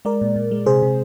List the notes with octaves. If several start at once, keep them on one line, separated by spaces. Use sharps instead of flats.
G#3 A#4 D5
A#2
A#2
G#3
C3 G#4 C5
C3